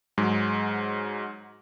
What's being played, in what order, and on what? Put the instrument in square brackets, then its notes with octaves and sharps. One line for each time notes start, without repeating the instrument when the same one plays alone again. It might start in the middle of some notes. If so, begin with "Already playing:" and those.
[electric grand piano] G#2 F#3 G#3